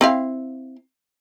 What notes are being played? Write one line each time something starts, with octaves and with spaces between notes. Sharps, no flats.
C4 E4 F5